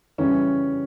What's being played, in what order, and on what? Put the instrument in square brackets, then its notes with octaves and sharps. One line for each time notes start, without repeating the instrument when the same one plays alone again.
[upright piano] C#3 E3 G3 C#4